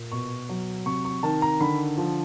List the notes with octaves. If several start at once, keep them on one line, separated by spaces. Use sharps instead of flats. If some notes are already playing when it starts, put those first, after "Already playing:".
Already playing: A#2
B2 C#6
F#3
C3 C#6
C#6
D#3 A5
A#5
D3 B5
F3